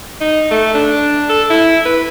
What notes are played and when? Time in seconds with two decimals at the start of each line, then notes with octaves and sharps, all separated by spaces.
0.21 D#4
0.51 A3
0.75 D4
1.29 A4
1.50 E4
1.86 B4